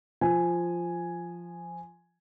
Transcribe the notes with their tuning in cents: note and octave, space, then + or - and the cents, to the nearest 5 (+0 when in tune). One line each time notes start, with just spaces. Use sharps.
F3 -5 G#5 +0